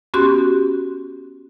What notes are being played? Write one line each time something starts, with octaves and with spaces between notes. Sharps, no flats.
B3 C#4 F#4 G4 C6 F#6